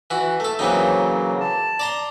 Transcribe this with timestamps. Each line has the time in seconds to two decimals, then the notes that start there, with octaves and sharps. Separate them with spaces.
0.10 E3 F#4
0.40 A3 A4
0.59 C#3 E3 F#3 A#3 C4 D#4
1.40 A5
1.80 D5 A#5 C6